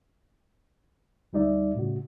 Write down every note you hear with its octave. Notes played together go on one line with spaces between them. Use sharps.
D2 G3 D#4 D5 E5
A2 C#3 F#4